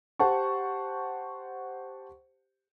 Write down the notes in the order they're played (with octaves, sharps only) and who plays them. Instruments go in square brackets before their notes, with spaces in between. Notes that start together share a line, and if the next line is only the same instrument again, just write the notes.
[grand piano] G4 C5 F#5 A5 C#6